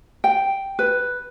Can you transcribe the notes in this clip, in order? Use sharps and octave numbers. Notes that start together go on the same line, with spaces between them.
G5
B4